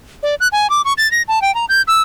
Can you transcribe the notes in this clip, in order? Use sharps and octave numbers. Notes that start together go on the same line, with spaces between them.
D5
F#6
G#5
D6
C#6
A6
A#6
A5
G5
A#5
G6
E6